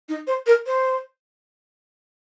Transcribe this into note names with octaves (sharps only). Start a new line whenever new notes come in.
D#4
C5
A#4
C5